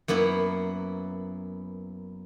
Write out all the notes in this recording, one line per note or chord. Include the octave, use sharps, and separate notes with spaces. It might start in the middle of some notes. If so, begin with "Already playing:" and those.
F#2 A#3 B3 E4